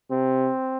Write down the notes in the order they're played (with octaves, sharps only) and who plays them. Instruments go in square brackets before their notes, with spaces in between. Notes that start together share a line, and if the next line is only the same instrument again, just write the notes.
[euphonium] C3 [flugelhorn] C4